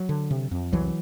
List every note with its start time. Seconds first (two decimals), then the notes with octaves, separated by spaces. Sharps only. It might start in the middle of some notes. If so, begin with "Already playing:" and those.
Already playing: F#3
0.09 D3
0.31 C3
0.51 F2
0.72 C2 E3 F#3